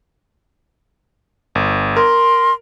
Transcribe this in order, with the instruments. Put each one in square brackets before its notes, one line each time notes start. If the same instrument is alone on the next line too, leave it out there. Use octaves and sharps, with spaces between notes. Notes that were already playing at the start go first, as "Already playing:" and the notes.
[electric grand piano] G1
[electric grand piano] A#4 [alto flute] C6